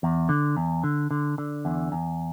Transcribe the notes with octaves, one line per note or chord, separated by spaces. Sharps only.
E2
D3
E2
D3
D3
D3
E2
E2